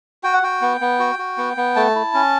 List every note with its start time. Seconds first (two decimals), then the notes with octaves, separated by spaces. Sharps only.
0.24 F#4 G5
0.33 F#5
0.43 F#4 G5
0.61 B3
0.81 B3
0.99 F#4
1.19 F#4
1.38 B3
1.57 B3
1.76 A3 A5
1.95 E4
2.14 C#4